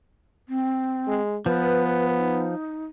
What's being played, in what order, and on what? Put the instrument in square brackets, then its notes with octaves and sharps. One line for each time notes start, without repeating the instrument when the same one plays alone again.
[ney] C4
[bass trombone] G#3
[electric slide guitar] F3 [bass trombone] B3 [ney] B4
[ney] D#4